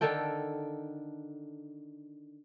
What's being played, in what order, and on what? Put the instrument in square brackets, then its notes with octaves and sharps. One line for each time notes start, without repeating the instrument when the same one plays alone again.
[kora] D3 D#3 A4 G5